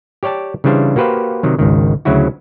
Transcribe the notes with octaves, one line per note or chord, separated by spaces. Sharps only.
G4 C#5 D5 G5 A5
C#3 E3 G3 D4 C5 F5
A#3 F#4 G4 B4 C5 F5
C3 D#3 F#3
G#1 C#2 D#3
D2 C#3 F#3 E4 F#4